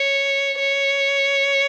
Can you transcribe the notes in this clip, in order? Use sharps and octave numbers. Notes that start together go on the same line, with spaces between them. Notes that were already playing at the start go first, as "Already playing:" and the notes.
Already playing: C#5
C#5